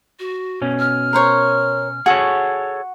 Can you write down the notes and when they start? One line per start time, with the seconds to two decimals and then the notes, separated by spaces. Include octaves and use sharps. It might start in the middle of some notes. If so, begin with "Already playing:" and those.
0.20 F#4
0.62 B2 C#4
0.79 F6
1.13 A#4 C5 C#5
2.06 F#4 G#4 A4 C#5